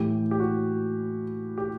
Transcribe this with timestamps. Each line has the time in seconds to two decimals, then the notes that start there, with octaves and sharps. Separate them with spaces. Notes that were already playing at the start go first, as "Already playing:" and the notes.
Already playing: A2 E3 G4
0.31 G4
0.40 F#4
1.58 G4